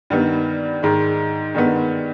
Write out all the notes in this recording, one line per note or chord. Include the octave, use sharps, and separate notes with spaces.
G2 D#3 G3 B3
G#2 D#3 G#3
G2 D#3 G#3 B3